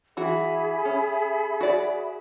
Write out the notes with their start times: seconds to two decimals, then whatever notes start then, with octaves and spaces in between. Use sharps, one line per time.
0.17 E3 F#4 G#4 E5 B5
0.85 C#4
1.61 F#4 D5